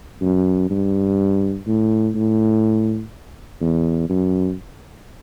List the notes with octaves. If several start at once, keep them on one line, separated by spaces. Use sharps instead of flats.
F#2
G2
A2
A2
E2
F#2